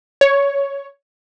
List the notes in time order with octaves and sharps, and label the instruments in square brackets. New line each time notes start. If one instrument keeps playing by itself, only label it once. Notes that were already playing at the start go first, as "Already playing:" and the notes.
[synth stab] C#5